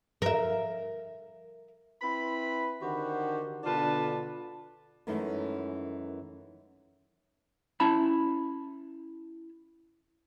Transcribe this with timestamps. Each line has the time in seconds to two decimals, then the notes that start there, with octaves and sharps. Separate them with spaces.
0.22 A#4 E5
2.02 C4 E4 B4 B5
2.80 D3 D#3 F#4 G4 C5 F#5
3.64 B2 D3 D4 F4 B4 A5
5.07 F#2 D#3 E3 G#3 A3 C#4
7.80 C#4 E4 A5 B5